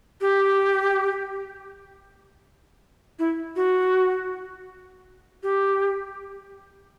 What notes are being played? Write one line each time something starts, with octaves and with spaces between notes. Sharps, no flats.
G4
E4
F#4
G4